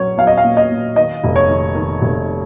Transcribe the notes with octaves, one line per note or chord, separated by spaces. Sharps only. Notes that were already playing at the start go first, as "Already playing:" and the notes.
Already playing: A#1 F#3 C#4 C#5
F#3 F5
D#5
F5
A#2
D#5
A#2
D#3 D#5
F1
C#5
D#3
D#3
F1